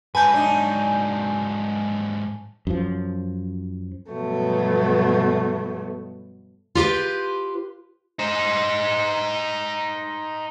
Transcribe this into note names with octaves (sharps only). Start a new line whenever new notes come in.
G#2 F#3 B4 G#5 A5 G6
D4 D#4
F#2 F3
G2 B2 F3 F#3 A3 B3
F4 G4 B4 C5
D#4 C5